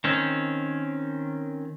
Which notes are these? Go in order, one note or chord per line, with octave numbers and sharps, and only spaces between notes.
D#3 C4 C#4